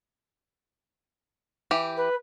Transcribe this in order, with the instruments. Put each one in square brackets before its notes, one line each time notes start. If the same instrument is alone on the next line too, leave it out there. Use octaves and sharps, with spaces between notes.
[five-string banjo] E3 G4
[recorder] B4